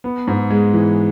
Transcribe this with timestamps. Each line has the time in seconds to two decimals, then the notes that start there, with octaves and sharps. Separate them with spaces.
0.04 B3
0.27 G#2
0.50 G#3
0.73 E3